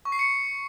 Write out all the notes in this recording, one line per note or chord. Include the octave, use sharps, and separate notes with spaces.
C#6
C7
C#7